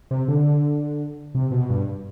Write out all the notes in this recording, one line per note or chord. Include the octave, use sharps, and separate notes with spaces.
C3
D3
C3
B2
G2